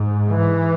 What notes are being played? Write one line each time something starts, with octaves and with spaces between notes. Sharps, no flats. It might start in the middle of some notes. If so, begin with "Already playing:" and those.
Already playing: G#2
E3